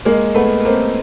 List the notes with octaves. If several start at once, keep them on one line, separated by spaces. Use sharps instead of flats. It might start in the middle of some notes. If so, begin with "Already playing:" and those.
G#3 A#3
A3 B3
A#3 C4